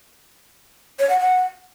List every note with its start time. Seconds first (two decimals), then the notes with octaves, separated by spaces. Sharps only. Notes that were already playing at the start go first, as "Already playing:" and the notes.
0.99 C#5
1.09 F#5
1.20 F#5